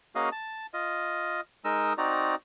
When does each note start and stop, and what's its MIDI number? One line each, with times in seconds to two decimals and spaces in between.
0.15 0.29 58
0.15 0.29 61
0.15 0.29 66
0.15 0.29 68
0.15 0.29 75
0.15 0.29 77
0.32 0.66 81
0.74 1.41 65
0.74 1.41 75
1.65 1.93 56
1.65 1.93 63
1.65 1.93 70
1.65 1.93 75
1.65 1.93 88
1.98 2.35 60
1.98 2.35 63
1.98 2.35 66
1.98 2.35 74
1.98 2.35 82